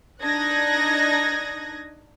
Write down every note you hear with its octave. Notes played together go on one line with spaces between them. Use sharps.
D4 D#4 D#6 F#6 G#6 A#6